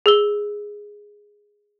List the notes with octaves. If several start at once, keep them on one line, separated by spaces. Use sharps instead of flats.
G#4 E6 G7